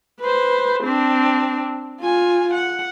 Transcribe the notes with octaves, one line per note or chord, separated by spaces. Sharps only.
B4 C5
C4 D4
F4 G#5
F#5